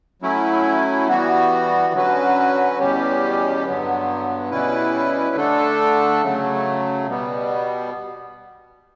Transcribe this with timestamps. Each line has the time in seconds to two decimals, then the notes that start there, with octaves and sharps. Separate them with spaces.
0.22 F#3 A3 C#4 E4
1.08 E3 G3 B3 F#4
1.93 D3 F#3 C#4 F#4 B4
2.79 E2 B2 G3 C#4 G4
3.64 G2 D3 F#3 B3
4.51 B2 G3 C#4 E4 B4
5.36 D3 A3 D4 A4
6.22 C#3 F#3 A3
7.08 B2 G3 B3